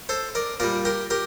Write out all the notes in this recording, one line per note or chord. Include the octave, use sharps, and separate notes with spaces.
A4 C5
A#4 D5
A#2 G3 A#4 D5
G4 A#4
G4 A#4